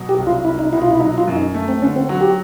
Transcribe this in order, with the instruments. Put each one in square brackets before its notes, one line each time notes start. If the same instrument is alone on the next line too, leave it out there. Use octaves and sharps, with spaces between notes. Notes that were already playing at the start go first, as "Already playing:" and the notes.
Already playing: [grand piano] B2 F#3
[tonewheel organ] G4
[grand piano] C2
[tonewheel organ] F4
[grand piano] C2 [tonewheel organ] E4
[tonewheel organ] D#4
[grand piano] B2 [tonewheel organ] E4
[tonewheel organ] F4
E4
[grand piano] F#3 [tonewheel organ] D#4
[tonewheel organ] F4
[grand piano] F#2
[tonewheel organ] D#4
[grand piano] A3
[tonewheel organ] C4
[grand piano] D3 [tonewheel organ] C#4
[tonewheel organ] C4
[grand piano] F#3 [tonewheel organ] F#4
[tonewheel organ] G4